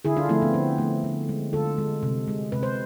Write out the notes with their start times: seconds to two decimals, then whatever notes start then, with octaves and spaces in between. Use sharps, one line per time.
0.05 D3 E4 G#4
0.17 D4 F4
0.29 F3 A3 C4 E4
0.42 B3 D4
0.54 D3 C4
0.78 F3 A3
1.04 D3
1.29 G#3
1.53 D3 F4 A4
1.78 G#3
2.03 C3
2.28 G#3
2.52 C3 B4
2.63 C5